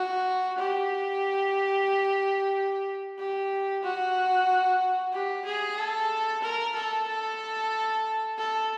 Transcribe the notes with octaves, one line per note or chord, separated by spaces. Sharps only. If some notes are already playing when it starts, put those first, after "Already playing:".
Already playing: F#4
G4
G4
F#4
G4
G#4
A4
A#4
A4
A4
A4